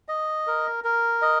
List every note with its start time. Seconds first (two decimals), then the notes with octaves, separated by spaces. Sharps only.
0.08 D#5
0.47 A#4
0.84 A#4
1.22 D#5